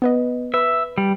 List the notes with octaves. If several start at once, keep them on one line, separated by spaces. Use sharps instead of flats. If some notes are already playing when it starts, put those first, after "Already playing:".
B3 B4 D#5
B4 E5 B5
G3